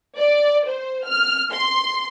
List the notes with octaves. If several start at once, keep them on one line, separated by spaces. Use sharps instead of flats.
D5
C5
F6
C6